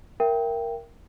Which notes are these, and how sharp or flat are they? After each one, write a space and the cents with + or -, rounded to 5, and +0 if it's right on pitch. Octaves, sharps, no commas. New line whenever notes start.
A#4 +0 E5 +40 G5 +0